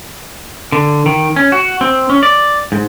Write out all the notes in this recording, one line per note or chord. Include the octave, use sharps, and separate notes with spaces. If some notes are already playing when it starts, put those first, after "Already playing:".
D3
D#3
C#4
F#4
C4
C#4
D5
G#2